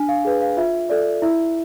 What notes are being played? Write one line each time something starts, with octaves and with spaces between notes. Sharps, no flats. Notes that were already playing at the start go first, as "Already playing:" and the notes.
Already playing: D4 G#5
F5
G#4 B4
F5
F4 E5
A4 D5
E4 E5